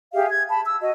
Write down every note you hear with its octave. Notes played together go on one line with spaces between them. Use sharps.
G4 G#4 E5 F5
G#6
A5 B5
E6
F#4 D#5